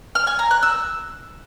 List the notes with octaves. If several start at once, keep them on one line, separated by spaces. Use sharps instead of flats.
F6
G#5
A#5
F#6
E6